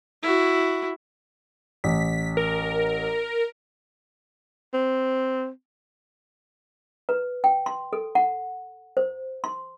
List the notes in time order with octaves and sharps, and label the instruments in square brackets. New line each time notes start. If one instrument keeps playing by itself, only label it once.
[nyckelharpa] E4 F#4
[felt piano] A1 [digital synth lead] B6
[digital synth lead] A#4
[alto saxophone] C4
[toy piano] B4
G5
C6
A4
F#5
C5
C6